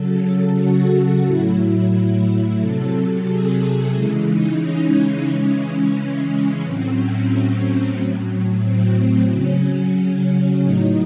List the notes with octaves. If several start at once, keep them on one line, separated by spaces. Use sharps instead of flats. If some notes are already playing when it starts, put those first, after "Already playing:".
Already playing: C#3 F#3 A4
F#4
A2 F#3 E4
C3 F#3 A4
G#4
C#3 E3 G#3 E4
D#4
C#4
C#3 E3 G#3 C#4
A2 F#3 C4
C#4
C#4
A2 F#3
C4
C#3 F#3 C#4
A2 F#3 D#4